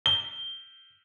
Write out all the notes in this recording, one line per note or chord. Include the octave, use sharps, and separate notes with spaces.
G7